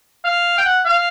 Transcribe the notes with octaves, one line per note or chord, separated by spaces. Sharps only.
F5
G5
F#5
F5